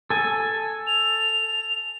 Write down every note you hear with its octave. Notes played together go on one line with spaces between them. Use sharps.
A4 G#5
F7